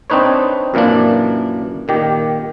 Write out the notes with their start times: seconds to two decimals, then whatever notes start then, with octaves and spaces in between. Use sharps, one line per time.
0.10 C4 D4 D#4 B4 C#5
0.74 F#2 A#2 E3 A#3 D4
1.88 A#2 D#3 G4